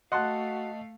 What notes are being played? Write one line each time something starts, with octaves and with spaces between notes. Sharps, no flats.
A3 F#4 D#5 F5 F#5 A5 C6 F#6